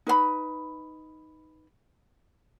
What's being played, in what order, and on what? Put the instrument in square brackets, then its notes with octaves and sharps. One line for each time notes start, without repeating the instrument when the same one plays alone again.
[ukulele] D#4 B4 F5 B5